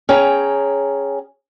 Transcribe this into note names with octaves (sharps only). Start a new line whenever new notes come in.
C#4 G#4 G5 A#5